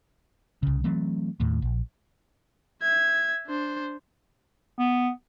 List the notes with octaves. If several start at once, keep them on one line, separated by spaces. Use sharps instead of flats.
C2 C#3
E3 F#3 A3 C4
D#2 A2
A#1
E5 G#6
D4 C5
B3